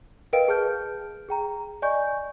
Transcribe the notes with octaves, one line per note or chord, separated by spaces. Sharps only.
A#4 B4 D#5 F5 G5 D7
G#4 A5 F6 G6
G#4 G5 A#5
D5 D#5 G#5 C#6 G6